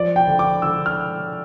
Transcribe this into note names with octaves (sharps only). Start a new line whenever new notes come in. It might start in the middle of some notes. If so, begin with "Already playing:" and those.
Already playing: F3 D5
G5
D3
D6
D3 E6
F6